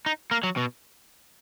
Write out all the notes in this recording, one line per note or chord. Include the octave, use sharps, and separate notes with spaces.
D#4
A#3
F#3
B2